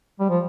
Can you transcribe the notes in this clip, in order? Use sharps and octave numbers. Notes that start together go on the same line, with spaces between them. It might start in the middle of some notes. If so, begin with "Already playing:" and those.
G3
F3